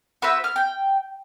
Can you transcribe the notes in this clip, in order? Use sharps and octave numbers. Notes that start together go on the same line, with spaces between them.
F#4 B4 C5 E5
F6
G5